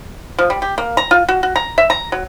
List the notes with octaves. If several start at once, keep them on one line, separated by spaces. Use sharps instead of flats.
F3
G3
G4
A#3
A#5
F4
F#4
F#4
A#5
E5
A#5
F#3